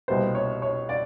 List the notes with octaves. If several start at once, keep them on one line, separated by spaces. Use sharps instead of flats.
C2 B2 G3 A#3 C5
C#5
C#5
D5